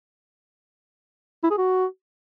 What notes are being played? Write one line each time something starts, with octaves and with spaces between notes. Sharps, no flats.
E4
G#4
F#4